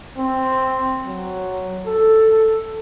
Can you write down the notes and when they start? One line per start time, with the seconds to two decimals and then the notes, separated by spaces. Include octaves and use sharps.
0.18 C4
1.04 F#3
1.87 A4